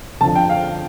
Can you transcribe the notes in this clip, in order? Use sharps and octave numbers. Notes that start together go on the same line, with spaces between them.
F2 D3 F3 A5
G5
F5